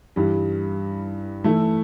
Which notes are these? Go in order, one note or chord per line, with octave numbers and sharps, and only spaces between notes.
G2 E3 G3
E3 A3 E4